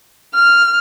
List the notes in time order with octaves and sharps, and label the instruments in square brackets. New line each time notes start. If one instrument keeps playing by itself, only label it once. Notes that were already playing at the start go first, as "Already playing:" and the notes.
[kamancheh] F6